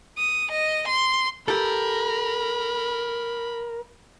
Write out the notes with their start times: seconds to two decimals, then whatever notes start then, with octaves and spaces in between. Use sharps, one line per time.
0.18 D#6
0.51 D#5
0.88 C6
1.48 G4 A4 A#4 B5